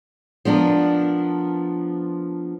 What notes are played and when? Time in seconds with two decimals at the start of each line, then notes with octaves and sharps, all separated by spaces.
0.45 F3 B3 D4 A#4